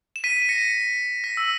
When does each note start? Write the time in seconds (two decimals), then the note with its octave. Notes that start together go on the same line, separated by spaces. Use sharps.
0.16 E7
0.24 B6 D#7
0.42 D#7
0.49 A#6 C#7
1.24 B6
1.37 E6